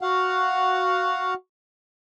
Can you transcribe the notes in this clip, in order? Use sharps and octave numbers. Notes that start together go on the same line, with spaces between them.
F#4 F5 F#5